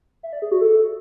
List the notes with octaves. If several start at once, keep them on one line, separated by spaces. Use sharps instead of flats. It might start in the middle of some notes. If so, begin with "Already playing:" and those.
E5
D5
G#4
F#4
A4